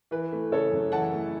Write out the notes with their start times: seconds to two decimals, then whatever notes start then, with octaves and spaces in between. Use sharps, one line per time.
0.11 E3 B4
0.32 A3
0.51 C#3 A4 C#5
0.72 F#2
0.92 E3 F#5 A5
1.13 A3